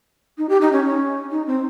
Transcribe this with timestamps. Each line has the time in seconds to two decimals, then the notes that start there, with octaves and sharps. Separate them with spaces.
0.38 D#4
0.49 G4
0.61 D#4
0.72 C#4
0.85 C#4
1.31 D#4
1.47 C4